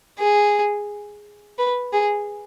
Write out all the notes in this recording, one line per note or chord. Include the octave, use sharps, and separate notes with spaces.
G#4
B4
G#4